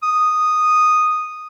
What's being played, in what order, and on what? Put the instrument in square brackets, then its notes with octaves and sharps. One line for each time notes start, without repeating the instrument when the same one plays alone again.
[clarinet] D#6